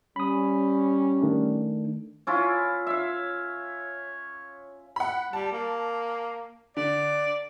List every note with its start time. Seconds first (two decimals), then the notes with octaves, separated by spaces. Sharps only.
0.16 G3 C#4 B5 D#6
1.21 D#3 A3 D4
2.27 C#4 E4 F4
2.87 C#5 E5 F5
4.96 F#5 B5
5.33 G3 A5
5.52 A#3
6.77 D3 D5